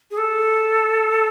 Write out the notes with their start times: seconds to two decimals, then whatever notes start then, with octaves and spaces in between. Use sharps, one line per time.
0.11 G#4
0.17 A4